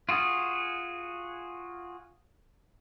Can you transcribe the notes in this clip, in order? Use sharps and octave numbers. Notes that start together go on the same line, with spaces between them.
F4 F#4 G#4 D#6